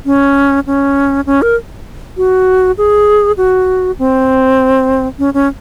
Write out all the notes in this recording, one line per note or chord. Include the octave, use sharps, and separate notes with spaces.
C#4
C#4
C#4
A#4
F#4
G#4
F#4
C4
C#4
C#4